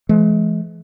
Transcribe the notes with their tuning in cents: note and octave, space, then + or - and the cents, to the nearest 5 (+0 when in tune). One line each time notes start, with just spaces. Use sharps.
E3 +45 G#3 +40